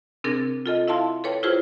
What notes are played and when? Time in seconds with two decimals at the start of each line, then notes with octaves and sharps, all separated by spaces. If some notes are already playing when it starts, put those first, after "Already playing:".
0.24 C3 C4 D4 G#4 A#4 A6
0.66 F4 A4 D#5
0.88 E4 E5 F5 A5 C6
1.24 A4 B4 C#5 G5
1.43 E4 F4 G4 G#4 B4 C5